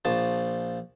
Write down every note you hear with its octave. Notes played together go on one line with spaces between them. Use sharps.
A#1 F3 A5